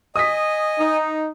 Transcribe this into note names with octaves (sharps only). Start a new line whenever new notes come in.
D#5 G#5 D#6 B6
D#4